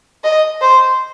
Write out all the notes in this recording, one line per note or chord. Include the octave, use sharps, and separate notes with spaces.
D#5
C5